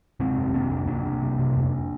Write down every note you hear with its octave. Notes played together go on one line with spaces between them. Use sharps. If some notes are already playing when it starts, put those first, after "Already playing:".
C3 G#3 C4
F2
C3 A#3 D4
F2
C3 A#3 D4
C3
C3
C3
F2